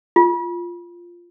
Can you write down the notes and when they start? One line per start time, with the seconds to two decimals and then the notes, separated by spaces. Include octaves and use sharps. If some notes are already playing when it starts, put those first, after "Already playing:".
0.16 F4